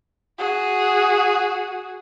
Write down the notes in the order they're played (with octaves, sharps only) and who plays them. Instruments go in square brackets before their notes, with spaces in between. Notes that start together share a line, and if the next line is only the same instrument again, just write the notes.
[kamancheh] F#4 G#4